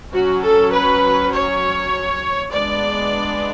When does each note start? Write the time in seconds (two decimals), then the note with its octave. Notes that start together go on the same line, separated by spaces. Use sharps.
0.12 F#3 C#4 F#4
0.42 A4
0.72 B4
1.33 C#5
2.52 G#3 B3 D4 D5